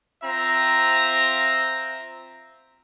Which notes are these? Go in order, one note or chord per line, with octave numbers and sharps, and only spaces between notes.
C4 F4 E5 A#5